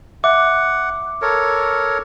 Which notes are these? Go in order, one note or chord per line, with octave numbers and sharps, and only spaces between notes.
E5 F#5 D6
A4 A#4 C#5